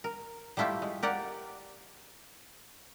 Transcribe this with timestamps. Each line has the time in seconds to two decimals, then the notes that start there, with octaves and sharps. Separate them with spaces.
0.04 A#4
0.57 G3 A3 E4 F4 G4
0.82 G#3
1.03 G4 A#4 D5 F#5